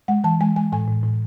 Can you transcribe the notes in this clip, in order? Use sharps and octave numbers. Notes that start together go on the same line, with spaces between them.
G#3 F#5
E3 A5
G#3 G#5
G#3 G#5
A2 G#5
A2
A2